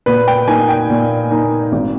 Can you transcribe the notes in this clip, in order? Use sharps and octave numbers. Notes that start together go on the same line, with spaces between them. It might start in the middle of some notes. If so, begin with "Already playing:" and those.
A#2 B4
G5
A#3 D#4 G#5
G5
A#2
A#3 D#4
G#1